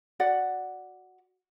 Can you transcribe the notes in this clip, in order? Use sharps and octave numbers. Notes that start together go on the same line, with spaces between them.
F#4 D5 F#5